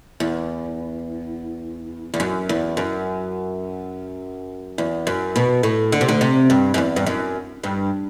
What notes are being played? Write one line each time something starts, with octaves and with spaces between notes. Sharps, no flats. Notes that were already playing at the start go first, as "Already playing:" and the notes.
E2
E2
F#2
E2
F#2
E2
F#2
B2
A2
D3
C3
D2 D3
C3
G2
F#2
E2
G2
F#2
G2